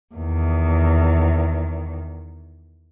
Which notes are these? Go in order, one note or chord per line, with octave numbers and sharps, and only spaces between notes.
E2 D#3